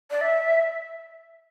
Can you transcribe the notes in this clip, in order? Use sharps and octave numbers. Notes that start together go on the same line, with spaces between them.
D5
E5